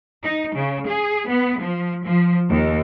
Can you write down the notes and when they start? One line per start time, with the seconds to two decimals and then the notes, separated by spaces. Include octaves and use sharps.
0.24 D#4
0.56 C#3
0.88 G#4
1.29 B3
1.61 F3
2.05 F3
2.49 D#2